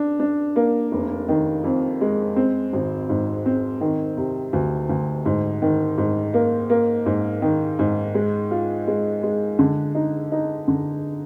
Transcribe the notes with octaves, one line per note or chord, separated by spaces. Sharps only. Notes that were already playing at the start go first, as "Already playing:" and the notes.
Already playing: D4
D4
A#3
F1
D#3
F2
G#3
C4
G#1
G#2
C4
D#3
C3
D2
D2
G#2
D#3
G#2
A#3
A#3
G#2
D#3
G#2
G#3
F4
G#3
G#3
D3
D#4
D#4
D3